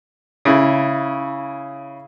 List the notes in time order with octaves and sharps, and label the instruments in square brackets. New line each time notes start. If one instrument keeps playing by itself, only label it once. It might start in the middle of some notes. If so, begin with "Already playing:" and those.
[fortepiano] C#3 E4